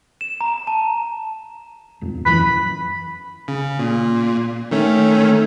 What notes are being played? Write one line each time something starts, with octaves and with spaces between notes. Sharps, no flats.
E7
A#5
A5
D#1 F2
F#2 E3 F#3 B5
C#3
A#2
D#3 A3 C#4